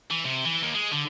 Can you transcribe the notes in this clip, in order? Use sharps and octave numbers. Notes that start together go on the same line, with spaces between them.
E3
C3
E3
D#2
G#3
D3